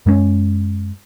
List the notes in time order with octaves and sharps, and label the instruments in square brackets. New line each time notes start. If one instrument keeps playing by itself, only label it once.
[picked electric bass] F#2 G#3 B3 C#4